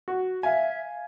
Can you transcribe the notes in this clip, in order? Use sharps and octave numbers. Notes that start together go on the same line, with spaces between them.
F#4
E5 F5 G#5